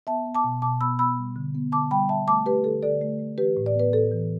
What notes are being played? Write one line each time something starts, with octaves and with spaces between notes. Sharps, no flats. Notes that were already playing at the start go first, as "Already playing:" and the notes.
B3 E5 A5
B3
A5 D6
B2
B2 A5 D6
B3 B5 E6
B3 B5 E6
G3
D3
B3
D3 A5 D6
G3 G5 B5
D3 E5 A5
A3 A5 D6
A3 G4 B4
D3 A4
D3 A4 D5
A3
A3
E3 G4 B4
A2
D5
B3 B4
A2 A4
E3